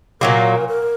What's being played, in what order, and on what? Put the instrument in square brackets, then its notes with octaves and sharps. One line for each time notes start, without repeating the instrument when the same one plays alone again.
[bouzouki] A#2 F#3 A#3 [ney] A#4
[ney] A#4